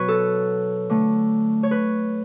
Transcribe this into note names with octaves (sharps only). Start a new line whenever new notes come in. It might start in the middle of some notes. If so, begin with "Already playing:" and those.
Already playing: B2 F#3 B4 C#5
A4
D3 A3
C#5
B4